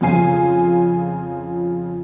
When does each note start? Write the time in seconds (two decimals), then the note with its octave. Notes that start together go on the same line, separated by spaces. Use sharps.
0.01 F2 C#3 F4 G#5 C7